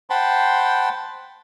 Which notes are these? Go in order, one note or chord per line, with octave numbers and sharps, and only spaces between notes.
C5 F#5 G5 A5 B5 C6